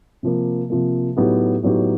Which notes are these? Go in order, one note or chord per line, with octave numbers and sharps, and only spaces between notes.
C3 F3 A#3
C3 F3 A#3
A2 F#3 B3 D#4 G4
A2 F#3 B3 D#4 G4